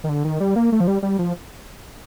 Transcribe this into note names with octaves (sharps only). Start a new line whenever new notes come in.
D#3
D3
D#3
G3
A#3
A3
F3
G3
G3
F3